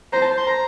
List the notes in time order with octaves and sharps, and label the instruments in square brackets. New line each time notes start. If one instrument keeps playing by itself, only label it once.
[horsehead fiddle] C5 [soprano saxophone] A#5
[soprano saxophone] A5
C6
A#5